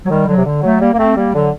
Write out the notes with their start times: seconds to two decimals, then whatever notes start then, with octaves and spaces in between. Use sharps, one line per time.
0.06 F#3
0.10 D#3 G3
0.27 D3 F#3
0.37 C3
0.45 D3
0.63 F#3 A3
0.81 G3 A#3
0.94 A#3
0.98 A3 C4
1.17 G3 A#3
1.34 D3 F#3